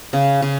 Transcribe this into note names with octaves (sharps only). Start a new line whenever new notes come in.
C#3
C#3